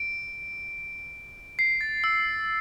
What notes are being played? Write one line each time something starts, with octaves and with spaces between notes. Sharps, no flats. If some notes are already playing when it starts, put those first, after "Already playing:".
Already playing: D7
C7
A6
E6